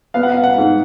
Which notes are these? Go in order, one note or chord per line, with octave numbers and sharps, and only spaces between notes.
B3 F5
F#5
F5
F#5
G#2